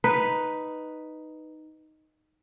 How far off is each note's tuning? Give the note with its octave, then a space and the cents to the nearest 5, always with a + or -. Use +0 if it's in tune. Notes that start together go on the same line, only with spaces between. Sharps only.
D#4 +0 B4 +0